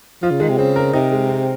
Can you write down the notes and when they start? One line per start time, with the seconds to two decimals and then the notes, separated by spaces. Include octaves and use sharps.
0.23 F3 F4
0.31 C#3
0.40 D#3 G#3
0.49 C3
0.58 C#3 C4
0.76 A#4
0.93 C3 D#4
1.12 G#3
1.29 C4